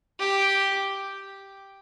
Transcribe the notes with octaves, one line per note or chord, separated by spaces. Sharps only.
G4